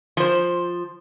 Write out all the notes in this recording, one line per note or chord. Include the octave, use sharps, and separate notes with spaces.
F3 C5